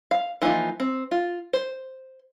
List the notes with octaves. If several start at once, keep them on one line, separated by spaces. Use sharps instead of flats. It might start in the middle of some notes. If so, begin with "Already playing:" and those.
F5
E3 F3 A#3 D#4 F4
C4
F4
C5